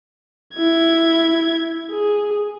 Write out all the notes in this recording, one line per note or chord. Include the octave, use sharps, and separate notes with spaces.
E4 G#6
G#4